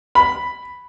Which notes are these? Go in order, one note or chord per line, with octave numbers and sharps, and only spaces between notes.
B5